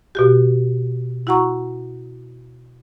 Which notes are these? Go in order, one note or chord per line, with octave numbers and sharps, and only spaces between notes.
B2 F#4 G4
E4 F#4 F#5 A#5 C#6